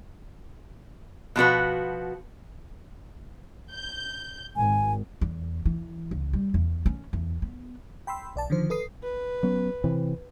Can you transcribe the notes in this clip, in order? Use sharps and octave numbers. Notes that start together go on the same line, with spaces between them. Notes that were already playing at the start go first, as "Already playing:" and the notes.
B2 F3 F#4 B4
G6
G#1 G#5
E2
E3
C#2
G3
E2
C#4
E2
B3
G5 B5 C6 E6
B1 D5 A5
D3 D#3 F3 C5
A4 B4 D#6 C7
B4
F#3 B3 C#4
C3 E3 C4